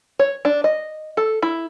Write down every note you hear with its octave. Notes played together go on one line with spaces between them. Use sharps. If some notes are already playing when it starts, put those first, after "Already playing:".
C#5
D4
D#5
A4
E4